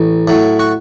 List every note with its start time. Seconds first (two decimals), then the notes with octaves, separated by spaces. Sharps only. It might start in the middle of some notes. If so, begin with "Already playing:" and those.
Already playing: A1
0.28 A2 F#3
0.59 F#4